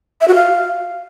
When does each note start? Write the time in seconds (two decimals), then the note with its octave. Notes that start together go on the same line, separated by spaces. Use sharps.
0.21 E5
0.28 F#4
0.35 F5